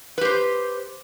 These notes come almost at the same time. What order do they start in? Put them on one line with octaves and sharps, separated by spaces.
B4 G4 C5